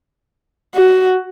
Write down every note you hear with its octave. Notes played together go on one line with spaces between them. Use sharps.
F#4